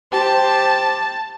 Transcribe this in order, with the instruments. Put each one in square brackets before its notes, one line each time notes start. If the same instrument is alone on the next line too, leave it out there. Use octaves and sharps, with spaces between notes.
[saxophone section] G4 C5 [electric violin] A5